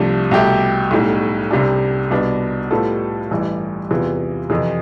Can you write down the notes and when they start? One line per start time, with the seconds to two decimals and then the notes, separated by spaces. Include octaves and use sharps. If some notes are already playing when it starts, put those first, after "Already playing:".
Already playing: C2 C3 F3 A3 D4
0.31 C2 B2 A3 E4 G4
0.91 B1 A2 G3
1.51 C2 C3 G3 D4
2.11 C2 B2 B3 D4
2.71 A2 G3 B3 F4 A4
3.31 A1 G2 E3 G3 D4
3.91 E2 C3 E3 B3 F4
4.50 F2 C3 E3